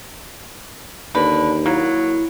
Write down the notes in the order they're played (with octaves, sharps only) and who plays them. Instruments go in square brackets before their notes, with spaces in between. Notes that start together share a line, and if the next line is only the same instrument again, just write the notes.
[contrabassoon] D#2 [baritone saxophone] D3 [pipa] B4
[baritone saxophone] F#3 [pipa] A#3 [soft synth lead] E4